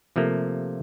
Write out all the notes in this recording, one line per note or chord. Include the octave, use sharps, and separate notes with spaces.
C3 F3 A3 A#3